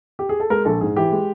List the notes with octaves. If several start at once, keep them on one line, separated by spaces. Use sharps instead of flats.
G4
G#4
A4
G#3 A#4
A#1 A4
G#2 G#4
E3 G4
G#3